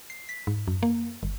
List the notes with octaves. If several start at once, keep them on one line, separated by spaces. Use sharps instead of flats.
C7
B6
G#2
F#2
A#3
G1